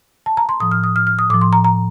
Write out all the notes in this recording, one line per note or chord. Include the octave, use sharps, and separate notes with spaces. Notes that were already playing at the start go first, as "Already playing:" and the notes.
A5
A#5
C6
A2 F3 D#6
F6
D#6
F6
F6
D#6
A2 F3 D6
C6
A#5
A#5